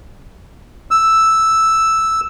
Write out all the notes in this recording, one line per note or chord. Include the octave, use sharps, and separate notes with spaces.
E6